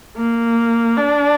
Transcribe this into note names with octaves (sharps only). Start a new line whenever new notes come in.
A#3
D4